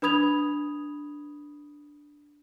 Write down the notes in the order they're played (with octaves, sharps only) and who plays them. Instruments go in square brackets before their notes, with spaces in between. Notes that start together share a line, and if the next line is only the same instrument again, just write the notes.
[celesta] D4 B4 B5 D#6 G#6 F7